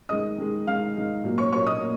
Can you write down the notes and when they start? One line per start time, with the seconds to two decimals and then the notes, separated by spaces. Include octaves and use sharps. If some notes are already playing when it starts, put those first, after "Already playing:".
0.09 D#3 G#3 D#5 D#6
0.38 D#3 G#3
0.67 D#3 G#3 F5 F6
0.96 D#3 G#3
1.24 A#2 F#3 A#3
1.38 C#5 C#6
1.53 A#2 F#3 A#3 C#5 C#6
1.67 D#5 D#6
1.81 A#3